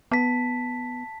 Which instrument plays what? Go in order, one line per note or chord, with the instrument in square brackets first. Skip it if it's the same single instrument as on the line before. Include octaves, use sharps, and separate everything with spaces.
[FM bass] B3 [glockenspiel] A5 B6